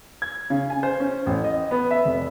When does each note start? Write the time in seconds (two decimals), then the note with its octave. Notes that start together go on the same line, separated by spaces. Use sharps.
0.22 G#6
0.50 C#3
0.70 G#5
0.83 C5
1.00 C#4
1.26 A1
1.44 D#5
1.71 B3
1.91 E5
2.05 F1